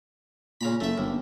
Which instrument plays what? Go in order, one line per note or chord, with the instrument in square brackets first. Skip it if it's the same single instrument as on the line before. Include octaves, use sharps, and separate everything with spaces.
[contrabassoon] A#2 [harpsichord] C#3 A#5 B5
[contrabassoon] F#1 [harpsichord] A3 E5
[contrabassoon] G1 [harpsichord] D#2